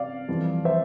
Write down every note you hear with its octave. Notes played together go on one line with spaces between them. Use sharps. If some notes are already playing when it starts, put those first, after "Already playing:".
Already playing: C3 D5 F5
F2 E3 G3
C5 E5